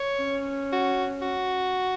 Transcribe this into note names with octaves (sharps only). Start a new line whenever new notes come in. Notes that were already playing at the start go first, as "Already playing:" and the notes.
Already playing: C#5
C#4
F#4
F#4